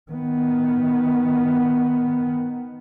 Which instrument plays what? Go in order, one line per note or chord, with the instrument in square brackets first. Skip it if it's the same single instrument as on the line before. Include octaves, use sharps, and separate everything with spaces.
[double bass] D#3 B3